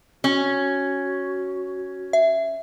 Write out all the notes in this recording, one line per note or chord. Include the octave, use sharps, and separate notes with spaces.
C#4 F#4
E5